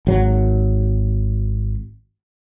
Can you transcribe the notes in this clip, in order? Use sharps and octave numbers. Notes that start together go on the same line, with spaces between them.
G#1 F#3